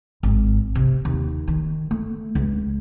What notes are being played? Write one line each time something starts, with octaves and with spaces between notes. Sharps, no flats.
G#1
C3
D#2
D#3
A3
C#2